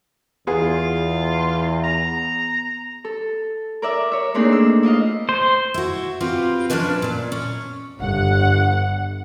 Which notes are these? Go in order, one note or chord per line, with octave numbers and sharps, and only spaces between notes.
E2 B3 F4 G#4
A#5
A4
A#4 D5 E5
C#5 E5
A3 A#3 C4 D4 D#4 G#4
E6
E4 F4 D#5 F5
C5
E4 F#4
C4 F4 G4 B4
F3 A#3 C#4 D4 B4
A#2 D5
C#4
G1 F#5